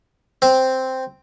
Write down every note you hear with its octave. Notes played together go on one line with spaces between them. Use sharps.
C4